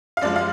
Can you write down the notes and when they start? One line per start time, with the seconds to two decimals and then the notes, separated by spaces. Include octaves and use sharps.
0.17 F5
0.22 F#2 F3 G#3 D5
0.36 F5